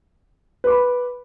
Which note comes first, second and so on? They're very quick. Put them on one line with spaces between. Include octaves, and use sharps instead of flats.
B4 D6 B5